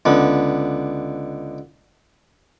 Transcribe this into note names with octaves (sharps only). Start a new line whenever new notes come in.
C#2 D3 B3